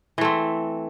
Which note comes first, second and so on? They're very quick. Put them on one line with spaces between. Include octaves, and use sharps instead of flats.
E3 A3 C4